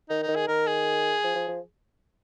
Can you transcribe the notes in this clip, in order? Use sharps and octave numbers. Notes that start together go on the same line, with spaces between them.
D#3 D#4
D#4
D#3
G#4
D#3 A#4
G#4
F3
F3
F3